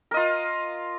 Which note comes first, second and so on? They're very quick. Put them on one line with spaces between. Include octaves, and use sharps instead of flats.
A#4 D#5 F4